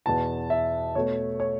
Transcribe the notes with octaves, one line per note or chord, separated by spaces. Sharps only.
E2 B2 B3 A5
E5
B2 A3 C#5
C#5